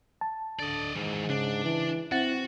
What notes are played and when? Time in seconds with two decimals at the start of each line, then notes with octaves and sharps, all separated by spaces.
0.21 A5
0.59 D3 D5 D#5
0.95 G#2 D#3 E3
1.30 C#3 D4
1.64 E3
2.12 C4 E4 F#4 F#5 A6